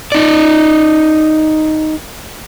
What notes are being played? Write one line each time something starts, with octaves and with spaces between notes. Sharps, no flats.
D#4 D5